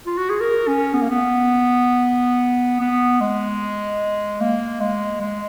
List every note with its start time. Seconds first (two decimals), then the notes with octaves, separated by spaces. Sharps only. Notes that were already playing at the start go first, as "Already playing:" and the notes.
0.06 F4
0.18 F#4
0.30 G#4
0.41 A#4
0.68 C#4
0.94 B3
1.02 A#3
1.10 B3
2.81 B3
3.21 G#3
4.41 A#3
4.80 G#3
5.21 G#3